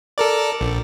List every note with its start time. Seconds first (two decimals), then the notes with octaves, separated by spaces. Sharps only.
0.18 A4 A#4 D5
0.61 A#1